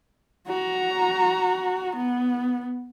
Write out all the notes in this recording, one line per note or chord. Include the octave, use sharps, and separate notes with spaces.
F#4 A#5
B3